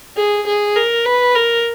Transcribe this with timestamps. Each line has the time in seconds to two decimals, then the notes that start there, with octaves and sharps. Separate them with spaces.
0.16 G#4
0.46 G#4
0.75 A#4
1.05 B4
1.35 A#4